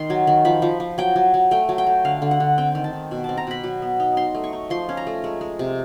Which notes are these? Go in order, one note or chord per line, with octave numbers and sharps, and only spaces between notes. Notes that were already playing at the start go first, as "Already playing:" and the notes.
Already playing: D#3 C6
F#3
D#3
F3 B5
F3
F3
F#3 G5
F#3
F#3
A3 G5
F#3
G5
A3
D3 F5
D3
F#5
D3
C4 G5
D#3
A5
D#3
B2
C4 A5
A#5
B2 B5
F#3
B3
D#4
D#4 C6
A3
C#6
D#4
F3 C6
C#4
A#5
A3
G#3
G#3
C3